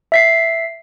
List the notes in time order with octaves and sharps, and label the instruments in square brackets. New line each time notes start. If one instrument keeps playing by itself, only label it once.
[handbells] E5 B6 C7